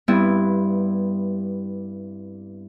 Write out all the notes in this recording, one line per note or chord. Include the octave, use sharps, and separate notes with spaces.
G2 G3 B3 C4 E4